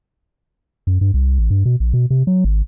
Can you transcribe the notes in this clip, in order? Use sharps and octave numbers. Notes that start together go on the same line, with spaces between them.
F#2
G2
C2
A1
G2
B2
A#1
B2
C3
F#3
G#1